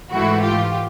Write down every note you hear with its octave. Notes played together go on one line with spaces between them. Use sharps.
G#2 E3 A3 E4 F#4
F4 G4